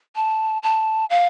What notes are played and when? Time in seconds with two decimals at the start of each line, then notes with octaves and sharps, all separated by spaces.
0.16 A5
0.63 A5
1.10 F5